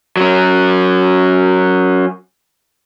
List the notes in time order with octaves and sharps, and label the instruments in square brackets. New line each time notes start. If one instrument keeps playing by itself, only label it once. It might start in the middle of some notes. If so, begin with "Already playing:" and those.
[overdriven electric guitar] F#3 C#4